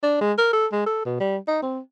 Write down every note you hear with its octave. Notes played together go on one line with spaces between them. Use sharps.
D4
G#3
A#4
A4
G#3
A4
B2
G3
D#4
C4